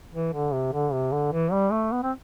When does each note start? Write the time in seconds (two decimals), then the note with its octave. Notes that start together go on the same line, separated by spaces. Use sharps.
0.13 E3
0.33 D3
0.53 C3
0.73 D3
0.93 C3
1.12 D3
1.32 E3
1.52 G3
1.72 A3
1.92 B3
2.03 C4